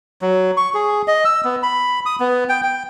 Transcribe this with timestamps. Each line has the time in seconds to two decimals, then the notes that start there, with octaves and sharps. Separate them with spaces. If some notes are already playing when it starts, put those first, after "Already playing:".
0.22 F#3
0.57 C#6
0.74 G#4
1.08 D#5
1.25 E6
1.44 B3
1.63 B5
2.06 D#6
2.20 B3
2.49 G5
2.64 G5